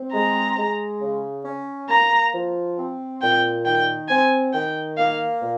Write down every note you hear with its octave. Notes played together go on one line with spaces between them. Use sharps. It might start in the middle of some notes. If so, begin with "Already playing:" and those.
Already playing: C4
G#3 A#5
G#3
C#3
C#4
A#3 A#5
F3
C4
A#2 G5
D#3 G5
C4 G#5
D#3 G5
A#3 F5
A#2